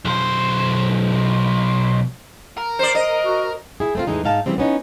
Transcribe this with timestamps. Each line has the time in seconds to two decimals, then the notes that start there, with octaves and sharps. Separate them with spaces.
0.05 B1 C5
2.58 A#4
2.79 C5 D5
2.95 D#5
3.24 F#4
3.80 E4 G#4
3.95 A3 C4 F4
4.07 E2 A2 E3 G#3 D#4
4.24 G#2 D#4 F5 A5
4.46 C#3 E3 G3 C4
4.58 B3 C#4 D#4